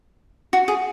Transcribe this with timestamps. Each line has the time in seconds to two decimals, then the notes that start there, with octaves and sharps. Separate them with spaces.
0.53 F#4
0.68 G#4